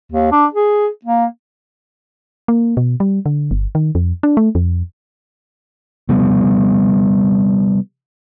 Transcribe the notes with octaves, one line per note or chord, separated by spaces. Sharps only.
D#2
D4
G#4
A#3
A#3
B2
G3
D3
G1
D#3
F2
D4
A3
F2
C3 F3 G3 B3